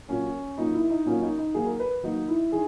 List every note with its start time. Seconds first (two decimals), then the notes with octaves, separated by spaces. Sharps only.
0.08 A#2 F#3 A#3 C#4
0.58 A#2 F#3 A#3 D#4
0.74 E4
0.90 D#4
1.06 A#2 F#3 A#3 C#4
1.22 D#4
1.38 D#4
1.54 D#3 F#3 A#3 G#4
1.66 A#4
1.79 B4
2.03 D#3 F#3 A#3 D#4
2.28 E4
2.52 D#3 G#4